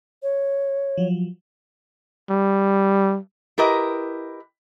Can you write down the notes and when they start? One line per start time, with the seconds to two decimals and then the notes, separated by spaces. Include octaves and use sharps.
0.23 C#5
0.98 F3 F#3
2.30 G3
3.58 E4 G4 A#4 B4 D#5